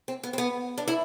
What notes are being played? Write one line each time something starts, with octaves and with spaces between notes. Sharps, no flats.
C4
B3
C4
B3
D4
E4